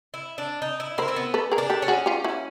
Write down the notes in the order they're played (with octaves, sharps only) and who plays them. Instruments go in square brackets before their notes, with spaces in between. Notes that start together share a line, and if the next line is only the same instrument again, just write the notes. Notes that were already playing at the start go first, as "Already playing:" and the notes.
[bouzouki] E4
D4
D#4
E4
[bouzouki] E4 [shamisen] A#4 C5
[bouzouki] C4
B3
[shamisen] A4 B4
G#4 A#4
[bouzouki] D4
[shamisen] G4 A4
[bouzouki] C#4
[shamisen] F#4 G#4
F4 G4
E4 F#4